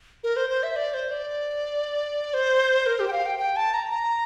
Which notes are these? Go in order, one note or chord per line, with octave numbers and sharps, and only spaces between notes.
A#4
C5
C5
E5
D5
C5
D5
C5
A#4
G4
G5
F5
G5
G5
A5
A#5
A#5